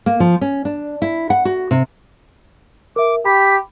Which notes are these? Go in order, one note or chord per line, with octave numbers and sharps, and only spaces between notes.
A#3
F3
C#4
D4
E4
F#5
F#4
C3
A#4 E5 D6
G4 B5 B6